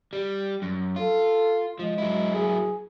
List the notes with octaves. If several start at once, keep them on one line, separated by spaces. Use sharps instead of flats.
G3
F#2
F4 A4
F3 G#3
F#3 E4
G#4